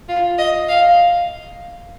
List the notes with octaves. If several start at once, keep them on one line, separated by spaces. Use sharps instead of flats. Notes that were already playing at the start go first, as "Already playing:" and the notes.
F4
D#5
F5